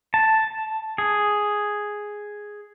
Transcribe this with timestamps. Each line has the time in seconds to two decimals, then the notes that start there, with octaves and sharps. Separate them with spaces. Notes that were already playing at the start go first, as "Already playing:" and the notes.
0.14 A5
0.98 G#4